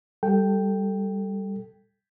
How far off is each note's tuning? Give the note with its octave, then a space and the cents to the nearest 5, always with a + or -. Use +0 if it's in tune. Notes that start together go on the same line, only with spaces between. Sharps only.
G3 +0 A4 +5 G5 +0